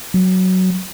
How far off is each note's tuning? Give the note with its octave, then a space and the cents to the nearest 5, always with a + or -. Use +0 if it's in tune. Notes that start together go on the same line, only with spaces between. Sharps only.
F#3 +5